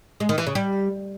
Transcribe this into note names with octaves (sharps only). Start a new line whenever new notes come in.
G#3
D#3
E3
C#3
G3